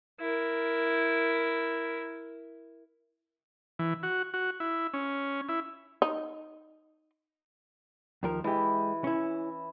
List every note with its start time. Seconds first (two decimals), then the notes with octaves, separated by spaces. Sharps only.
0.20 E4 A#4
3.79 E3
4.03 F#4
4.34 F#4
4.60 E4
4.94 C#4
5.49 E4
6.02 D#4
8.23 D#2 F3 A#4
8.44 E3 G#3 G4
9.04 C#4 E4